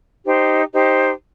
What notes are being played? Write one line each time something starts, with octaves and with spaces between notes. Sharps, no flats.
D#4 G4 C5
D#4 G4 C5